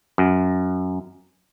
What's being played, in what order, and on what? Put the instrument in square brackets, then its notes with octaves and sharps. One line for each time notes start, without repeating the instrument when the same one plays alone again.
[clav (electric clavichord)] F#2